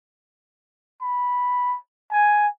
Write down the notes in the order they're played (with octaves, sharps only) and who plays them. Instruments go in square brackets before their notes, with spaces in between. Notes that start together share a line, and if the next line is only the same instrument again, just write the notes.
[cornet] B5
G#5